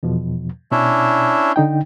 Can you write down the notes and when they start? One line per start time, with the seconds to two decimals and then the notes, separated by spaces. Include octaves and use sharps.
0.03 E2 B2 F3
0.71 B2 C#4 D4 E4
1.56 D3 D#4 G5